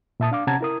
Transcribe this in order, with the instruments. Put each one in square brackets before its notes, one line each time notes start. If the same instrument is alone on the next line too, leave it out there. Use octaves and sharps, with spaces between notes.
[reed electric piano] A#2 E5 A5 D#6
D4 F5 D6
C3 C#4 F#5 A5 A#5 G#6
E4 A#4 D#6